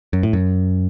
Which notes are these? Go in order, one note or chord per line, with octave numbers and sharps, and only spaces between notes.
F#2
A2
F#2